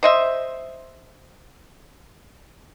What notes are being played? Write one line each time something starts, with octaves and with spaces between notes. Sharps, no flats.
C5 D#5 E5